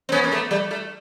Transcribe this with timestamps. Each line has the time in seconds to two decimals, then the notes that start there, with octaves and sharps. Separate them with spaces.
0.09 C4
0.12 B3 C#4
0.24 A#3
0.31 A3 B3
0.51 G3 A3
0.71 G3 A3